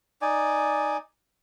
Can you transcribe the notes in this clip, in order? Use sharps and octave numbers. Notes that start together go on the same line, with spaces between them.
D#4 D5 G#5